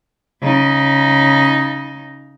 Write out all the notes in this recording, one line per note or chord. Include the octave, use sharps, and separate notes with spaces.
C#3 D#4